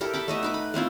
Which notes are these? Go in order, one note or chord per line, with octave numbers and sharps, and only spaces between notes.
E4 G4 A4 A#4
G5 A5 B5
A3 D#5 E5 F#5
D#4 B4 D6
B5
A3 C4 E4 F4